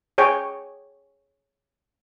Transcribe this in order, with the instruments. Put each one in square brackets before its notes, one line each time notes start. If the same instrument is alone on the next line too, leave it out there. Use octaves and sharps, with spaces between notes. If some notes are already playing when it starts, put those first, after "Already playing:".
[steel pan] G#4 C#5 G5 G#5